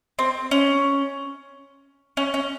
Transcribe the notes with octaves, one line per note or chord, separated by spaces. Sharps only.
C4
C#4
C#4
C#4